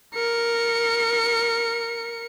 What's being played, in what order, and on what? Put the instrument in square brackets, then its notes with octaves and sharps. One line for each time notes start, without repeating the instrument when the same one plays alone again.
[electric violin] A#4 C#7